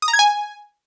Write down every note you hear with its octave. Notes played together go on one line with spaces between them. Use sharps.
D#6
A#5
G#6
G#5